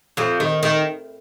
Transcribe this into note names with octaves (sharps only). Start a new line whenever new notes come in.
F2 F3
D#3
D#3